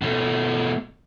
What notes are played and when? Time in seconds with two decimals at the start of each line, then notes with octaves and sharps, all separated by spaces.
0.02 B2 A3